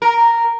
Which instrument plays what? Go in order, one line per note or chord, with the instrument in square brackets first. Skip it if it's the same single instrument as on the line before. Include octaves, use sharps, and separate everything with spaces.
[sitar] A#4